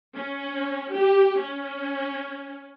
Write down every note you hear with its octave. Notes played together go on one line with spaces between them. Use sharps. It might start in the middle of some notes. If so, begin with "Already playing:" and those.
C#4
G4
C#4